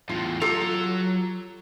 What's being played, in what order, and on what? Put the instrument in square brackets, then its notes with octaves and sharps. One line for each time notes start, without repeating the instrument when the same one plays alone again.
[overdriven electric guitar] E2 A2 [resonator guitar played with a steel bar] F4
[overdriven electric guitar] F#3 A#5 [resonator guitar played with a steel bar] F4 G4 A4